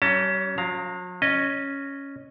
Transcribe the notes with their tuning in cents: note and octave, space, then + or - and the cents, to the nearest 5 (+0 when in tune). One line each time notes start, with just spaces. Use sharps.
G3 -40 C#4 +15 A5 +35
F#3 -45 F5 +0 A#5 +0
C#4 +0 D#5 -15